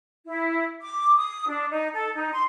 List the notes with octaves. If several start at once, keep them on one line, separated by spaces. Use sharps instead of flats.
E4
D6
D#6
D4
D#4
A4
D#4
C6